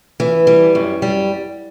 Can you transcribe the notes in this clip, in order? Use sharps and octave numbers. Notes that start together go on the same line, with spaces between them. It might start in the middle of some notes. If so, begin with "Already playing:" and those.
E3
G3
F#2
G3